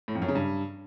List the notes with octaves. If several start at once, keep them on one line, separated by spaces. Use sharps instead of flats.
A2
F2
F#2
C#3
G2